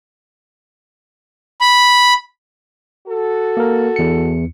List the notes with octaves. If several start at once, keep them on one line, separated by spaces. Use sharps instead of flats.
B5
F#4 A4
A#3 A#4
E2 C#7